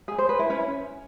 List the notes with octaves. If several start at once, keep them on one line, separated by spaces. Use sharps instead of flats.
G#4
C5
B4
E4
C#4